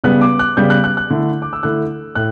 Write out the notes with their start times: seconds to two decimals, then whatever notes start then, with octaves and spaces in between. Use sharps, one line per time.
0.04 C#3 G3 B3 F#6
0.21 D6
0.39 F#6
0.57 C#3 G3 B3 G6
0.70 F#6
0.84 F#6
0.97 F#6
1.10 D3 A3 E4
1.42 D6
1.53 E6
1.63 D3 A3 E4 F#6
2.15 A2 F#6